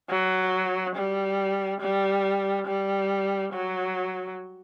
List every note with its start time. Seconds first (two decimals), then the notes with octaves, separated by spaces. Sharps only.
0.10 F#3
0.96 G3
1.81 G3
2.67 G3
3.53 F#3